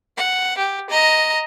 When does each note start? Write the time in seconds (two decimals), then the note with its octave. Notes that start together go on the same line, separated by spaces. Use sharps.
0.17 F#5
0.58 G4
0.90 D#5 A#5